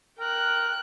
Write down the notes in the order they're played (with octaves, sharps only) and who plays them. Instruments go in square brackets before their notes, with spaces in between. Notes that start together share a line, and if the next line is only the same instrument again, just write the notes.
[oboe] A#4 [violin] G5 F#6